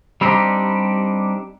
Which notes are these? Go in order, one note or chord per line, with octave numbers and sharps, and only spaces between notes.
G3 C4 D4 D#4 F#4 G4